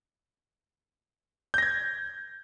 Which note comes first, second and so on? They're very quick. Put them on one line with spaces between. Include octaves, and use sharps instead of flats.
G6 A#6 G#6